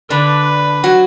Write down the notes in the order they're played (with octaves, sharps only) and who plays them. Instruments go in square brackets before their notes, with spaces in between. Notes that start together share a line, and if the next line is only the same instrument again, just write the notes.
[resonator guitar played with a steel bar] D3 D4 [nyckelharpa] B4
[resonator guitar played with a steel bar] F#3 F#4